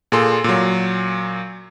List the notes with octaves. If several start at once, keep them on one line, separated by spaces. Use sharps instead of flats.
A#2 G#4 A4 C6
A#2 F#3